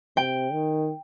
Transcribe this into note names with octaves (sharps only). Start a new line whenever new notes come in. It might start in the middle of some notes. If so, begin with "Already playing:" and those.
C3 G5
D#3